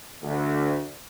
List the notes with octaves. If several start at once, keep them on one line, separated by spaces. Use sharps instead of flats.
D2